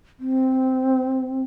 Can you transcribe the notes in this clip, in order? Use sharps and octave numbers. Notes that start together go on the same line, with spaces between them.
C4